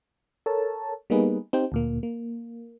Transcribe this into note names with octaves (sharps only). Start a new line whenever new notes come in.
A4 A#4 C#5 A5
G3 A#3 B3 D#4 G#4 B4
C4 D#4 G4 C5 G5
D2 A#2 A#3
A#3